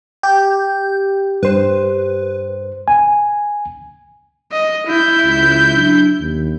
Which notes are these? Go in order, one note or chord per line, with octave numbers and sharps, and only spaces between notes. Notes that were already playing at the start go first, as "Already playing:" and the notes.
G4 G6
G2 B4 C5
G#5
D#5
E4 G6
C#2
F#3 D4
D#2